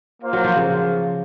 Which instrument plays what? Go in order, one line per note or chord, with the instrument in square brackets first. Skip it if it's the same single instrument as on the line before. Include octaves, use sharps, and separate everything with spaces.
[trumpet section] A#3 F4 C5 F5
[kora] F#3
F3
C#3